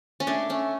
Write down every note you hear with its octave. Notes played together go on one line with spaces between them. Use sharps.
C#4
A3 D4
A3 C#4